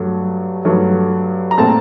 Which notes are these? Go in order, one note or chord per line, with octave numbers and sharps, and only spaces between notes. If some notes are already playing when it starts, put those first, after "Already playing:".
Already playing: G2 F#3 A3
G2 F#3 A3
A#5
A#2 A3 C4 A5